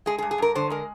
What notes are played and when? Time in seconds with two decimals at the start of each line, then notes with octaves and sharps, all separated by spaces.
0.06 G#3 G#4
0.18 G#4
0.22 G2
0.31 G#4
0.38 G2 A#4
0.55 D3 C5
0.70 G#3 A#4